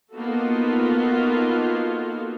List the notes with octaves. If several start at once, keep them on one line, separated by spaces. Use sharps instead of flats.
A#3 B3 D#4 F4 F#4 A4